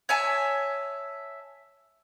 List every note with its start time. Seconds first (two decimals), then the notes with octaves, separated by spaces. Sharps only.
0.09 C#5 E5 G#5 A5